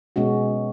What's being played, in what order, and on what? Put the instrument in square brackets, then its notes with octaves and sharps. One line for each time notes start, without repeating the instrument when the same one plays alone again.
[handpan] B2 G#3 C#4 F#4